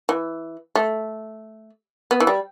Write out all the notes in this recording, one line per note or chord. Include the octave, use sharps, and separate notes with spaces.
E3
A3
B3
E3
G3